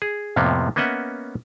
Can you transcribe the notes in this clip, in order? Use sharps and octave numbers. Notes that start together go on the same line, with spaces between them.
G#4
F2 A2 C3 F3 A#3 B3
A#3 B3 C#4 D#5 E5 F#5